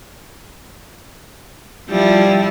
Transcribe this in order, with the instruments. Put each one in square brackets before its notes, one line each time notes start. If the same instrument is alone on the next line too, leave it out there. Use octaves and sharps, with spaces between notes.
[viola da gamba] F3 G3 E4